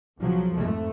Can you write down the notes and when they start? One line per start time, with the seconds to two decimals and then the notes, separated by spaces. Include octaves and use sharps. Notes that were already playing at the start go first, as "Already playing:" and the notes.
0.18 B1 C#3 F3 F#3
0.54 F2 G#2 A3